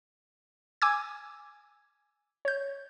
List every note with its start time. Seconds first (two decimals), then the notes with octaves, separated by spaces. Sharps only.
0.82 G#5 D6 E6 G#6
2.45 C#5 G6